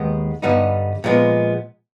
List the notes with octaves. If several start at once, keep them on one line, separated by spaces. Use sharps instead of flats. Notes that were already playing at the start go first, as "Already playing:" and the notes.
Already playing: D#2 D#3 G#3 B3
G2 D3 G3 B3 D#4
A#2 F3 G#3 B3